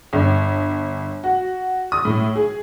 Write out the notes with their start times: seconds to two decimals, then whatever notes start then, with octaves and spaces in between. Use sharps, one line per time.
0.13 G1
1.24 F#4
1.92 D#6
2.05 A2
2.36 G#4